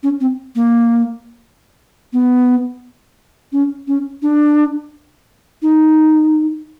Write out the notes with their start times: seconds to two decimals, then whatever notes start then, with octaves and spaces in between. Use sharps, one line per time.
0.03 C#4
0.21 C4
0.55 A#3
2.13 B3
3.52 C#4
3.88 C#4
4.22 D4
5.62 D#4